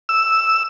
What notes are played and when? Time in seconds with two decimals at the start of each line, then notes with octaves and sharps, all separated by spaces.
0.09 E6